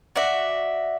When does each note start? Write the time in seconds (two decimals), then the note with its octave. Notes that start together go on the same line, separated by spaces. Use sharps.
0.16 F#4 D5 E5